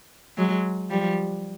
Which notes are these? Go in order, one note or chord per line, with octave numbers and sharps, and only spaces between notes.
F#3 G#3
F3 G3